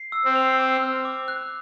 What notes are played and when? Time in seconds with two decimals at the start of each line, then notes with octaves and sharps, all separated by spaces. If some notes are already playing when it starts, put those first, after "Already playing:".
Already playing: C7
0.12 E6
0.25 C4
0.36 F7
0.60 D6
0.82 F6
1.05 D6
1.28 F#6